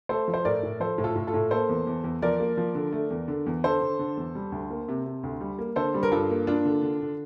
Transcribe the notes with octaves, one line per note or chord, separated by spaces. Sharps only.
A3 A4 C5
F3
C5
A2 A#4 D5
A2
F3 A4 C5
A2
F4 A4
A2
F4 A4
A2
A#3 A4 C5
E2
E2
E2
F3 A#4 D5
A#3
F3
D3
A3
E2
D3
E2
D3 A4 C5
D3
D3
E2
G3
D2
A#3
C3
C3
D2
G3
A#3
D3 A4 C5
G3
A#4
G2 F4 A4
A#3
A#3 D4 F4
D3
D3
D3